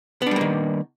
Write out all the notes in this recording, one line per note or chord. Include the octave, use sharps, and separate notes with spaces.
D#3 G3 A#3 B3 D4